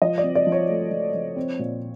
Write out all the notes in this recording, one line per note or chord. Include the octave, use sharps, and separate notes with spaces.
F3 D#5
D5
C4
D5
F3
C#5
A3
F3
F3
C4
A#2